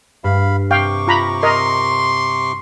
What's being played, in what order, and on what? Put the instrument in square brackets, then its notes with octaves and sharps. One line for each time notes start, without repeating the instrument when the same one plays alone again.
[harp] G2 [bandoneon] F5 B5
[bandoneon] C3 C#6 D6 [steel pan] F5 G5
[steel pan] F4 A#5 B5
[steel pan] A#4 D#5 A#5 [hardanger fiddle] C6